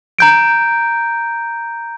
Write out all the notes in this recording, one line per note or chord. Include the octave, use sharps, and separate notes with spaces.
A#5 G6 D7